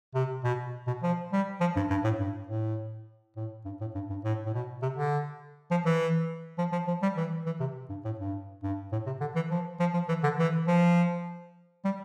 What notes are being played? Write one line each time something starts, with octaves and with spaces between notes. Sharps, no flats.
C3
B2
B2
F3
G3
F3
G2
G2
A2
G2
A2
A2
G2
A2
G2
G2
A2
A2
B2
C3
D3
F3
E3
F3
F3
F3
G3
E3
E3
C3
G2
A2
G2
G2
A2
C3
D3
E3
F3
F3
F3
E3
D3
E3
F3
G3